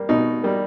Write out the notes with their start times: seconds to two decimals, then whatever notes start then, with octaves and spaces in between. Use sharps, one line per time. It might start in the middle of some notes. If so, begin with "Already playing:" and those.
Already playing: G3 A#3
0.09 B2 D#4
0.43 G3 A#3